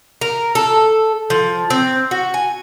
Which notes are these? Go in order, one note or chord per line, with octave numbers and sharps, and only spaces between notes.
A#4
A4
F3
C4
F#4
G#5